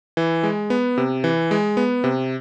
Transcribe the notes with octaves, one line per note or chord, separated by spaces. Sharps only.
E3
G#3
B3
C3
E3
G#3
B3
C3